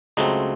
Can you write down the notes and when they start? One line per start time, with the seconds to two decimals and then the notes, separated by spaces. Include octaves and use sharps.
0.17 C#2 C#3 F#3 A3 C4 D#5